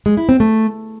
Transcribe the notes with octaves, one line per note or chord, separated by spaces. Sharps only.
G#3
E4
C4
A3